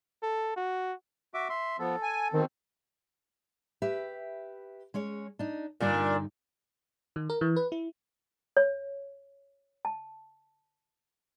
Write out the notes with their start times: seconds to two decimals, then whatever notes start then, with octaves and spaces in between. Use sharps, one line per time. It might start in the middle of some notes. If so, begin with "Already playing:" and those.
0.23 A4
0.56 F#4
1.34 F#4 E5 D6
1.49 E5 C6
1.79 F3 B3 A4
2.02 G#5
2.33 B2 D#3 C4
3.82 G4 B4 E5
4.94 G#3 C#4 C#5
5.39 D4 D#4
5.80 G2 A#2 D3 D4 D#4
7.16 D#3
7.30 A#4
7.41 E3
7.56 B4
7.72 E4
8.57 C#5
9.85 A5